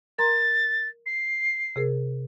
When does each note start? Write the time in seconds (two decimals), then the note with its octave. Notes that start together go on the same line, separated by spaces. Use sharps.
0.19 A#4 A#5 C6 A6
1.06 C7
1.76 C3 G#4 A#4